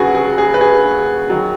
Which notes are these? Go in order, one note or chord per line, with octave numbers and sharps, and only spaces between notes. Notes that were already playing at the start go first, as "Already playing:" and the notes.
Already playing: D#2 C#3 F#3 F#4 G#4 B4
G#4
G#4
B4
G#4
D#3 F#3